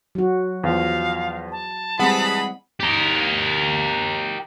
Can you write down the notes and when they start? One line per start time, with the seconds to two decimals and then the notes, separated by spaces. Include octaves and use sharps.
0.15 F#3 F#4
0.64 E2 F3 F5
1.52 A5
2.00 E3 G3 G#3 C4 G#4 F#5 B5
2.80 G4 A#4